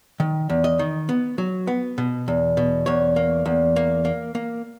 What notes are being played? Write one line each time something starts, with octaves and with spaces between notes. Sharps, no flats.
D#3
E2
D#5
D#3
B3
F#3
B3
B2
E2
B2
E2 C#5
A#3
E2
A#3
A#3
A#3